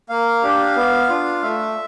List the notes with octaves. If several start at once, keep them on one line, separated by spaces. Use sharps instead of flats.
A#3 F5
D4 G4
B3
D4 F4
A3 E5